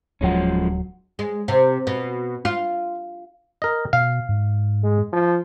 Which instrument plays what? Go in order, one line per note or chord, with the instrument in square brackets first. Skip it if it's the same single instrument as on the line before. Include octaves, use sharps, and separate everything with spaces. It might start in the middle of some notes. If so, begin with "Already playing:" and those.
[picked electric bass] D1 F#3 [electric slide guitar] F3 G#3 C#4
[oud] G#3
C3
B2
F4
[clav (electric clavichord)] A#4 D#5
[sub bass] B2 [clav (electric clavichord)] F5
[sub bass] G#2
[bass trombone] G#3
F3